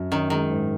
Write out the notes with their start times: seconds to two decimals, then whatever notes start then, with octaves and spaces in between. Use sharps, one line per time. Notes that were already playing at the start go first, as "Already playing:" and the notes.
Already playing: F#2
0.11 D#3 C#4
0.30 D#3 G#3
0.50 G#2